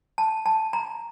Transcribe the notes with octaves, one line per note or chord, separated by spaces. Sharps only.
A5
A5
A#5